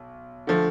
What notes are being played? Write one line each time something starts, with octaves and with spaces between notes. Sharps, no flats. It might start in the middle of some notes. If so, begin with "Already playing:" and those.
Already playing: B1
D3 F3 A3